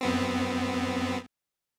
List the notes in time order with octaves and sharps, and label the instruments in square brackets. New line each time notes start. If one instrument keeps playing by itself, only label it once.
[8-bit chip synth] F#2 B3 C4